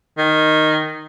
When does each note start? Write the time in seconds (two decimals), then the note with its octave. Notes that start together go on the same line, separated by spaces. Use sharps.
0.18 D#3